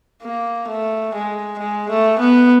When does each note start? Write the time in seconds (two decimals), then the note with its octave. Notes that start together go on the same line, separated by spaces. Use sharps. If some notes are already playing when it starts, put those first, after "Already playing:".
0.23 A#3
0.68 A3
1.14 G#3
1.59 G#3
1.90 A3
2.19 B3